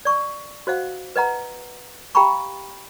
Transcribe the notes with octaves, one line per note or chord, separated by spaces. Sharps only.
D5 C#6
F#4 C5 D#5 F5 F#5
B4 D#5 F#5 A#5
G4 F5 G5 A#5 B5 C#6